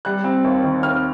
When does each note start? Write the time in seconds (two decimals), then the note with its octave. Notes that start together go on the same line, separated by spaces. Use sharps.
0.05 G3 F#6
0.24 C4
0.44 D#2
0.64 D#3
0.83 D#2 F6